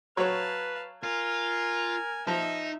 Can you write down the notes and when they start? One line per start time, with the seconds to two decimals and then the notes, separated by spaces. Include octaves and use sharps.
0.17 F#3 B4 C#5 F5 A5
1.03 F4 A#4 G#5
2.27 F3 D#4 E5